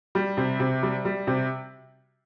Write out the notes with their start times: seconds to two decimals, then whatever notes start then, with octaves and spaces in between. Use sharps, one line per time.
0.15 G3
0.37 C3
0.60 C3
0.83 G3
1.05 G3
1.27 C3